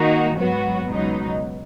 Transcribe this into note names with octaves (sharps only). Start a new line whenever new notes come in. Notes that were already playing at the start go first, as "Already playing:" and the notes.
Already playing: D#3 A#3 D#4 F#4
G#2 F#3 B3 F#4
C#2 B2 F#3 B3 D#4